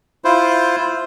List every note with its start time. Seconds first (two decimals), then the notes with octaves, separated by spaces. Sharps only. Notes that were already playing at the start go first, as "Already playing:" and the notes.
0.24 E4 F4 C5